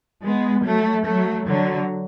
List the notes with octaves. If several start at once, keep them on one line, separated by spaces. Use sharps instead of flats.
G#3 B3
F#3 A3
F#3 A3
D3 F#3